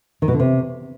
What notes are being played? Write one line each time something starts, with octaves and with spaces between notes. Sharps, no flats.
D#3
B2
D3
C3